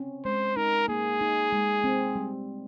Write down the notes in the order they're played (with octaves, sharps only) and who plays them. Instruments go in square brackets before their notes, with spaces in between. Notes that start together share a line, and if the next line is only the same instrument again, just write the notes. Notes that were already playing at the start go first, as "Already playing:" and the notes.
Already playing: [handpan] C4 C#4
[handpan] G#3 [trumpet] C5
[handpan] D#4 [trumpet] A#4
[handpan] A#3 [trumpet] G#4
[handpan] D#4
G#3
C4
G3